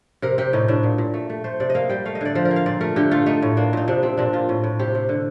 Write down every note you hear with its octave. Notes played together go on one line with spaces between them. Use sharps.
C3 A#4
C3 G4
A2 D#4
A2 D4
A#2
A#2
A3
A3
A3 C5
C3 D5
D#5
A#3 F5
G3 G5
A3 F5
D#5
D3 D5
F3 C5
A#4
A#3
F5
A#2 D5
A3 A#4
D3 G4
A3 F4
A3 D#4
A2
A#3 D4
A#2 D#4
C3 D4
C3 C4
A#2 D4
A#2 F4
A2
A2
C3 G4
C3
D3